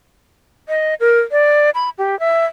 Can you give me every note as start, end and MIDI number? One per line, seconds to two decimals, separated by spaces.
0.69 0.94 75
1.00 1.20 70
1.31 1.70 74
1.75 1.90 83
1.98 2.18 67
2.20 2.45 76